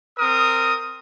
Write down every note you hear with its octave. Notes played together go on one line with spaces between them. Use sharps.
C4 A#4 D#6